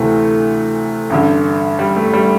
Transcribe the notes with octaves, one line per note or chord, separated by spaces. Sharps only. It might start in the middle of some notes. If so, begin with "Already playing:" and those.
Already playing: D2 C3 E3 A3
A1 G2 D3
G3
A3
G3